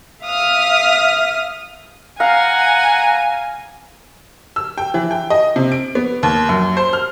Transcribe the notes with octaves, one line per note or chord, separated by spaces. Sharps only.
E5 F5 D#6 F6
F5 F#5 G#5 A#5
E6
G5
E3
G5
D#5
C3
D7
B3
D#2
F#2
C5
F6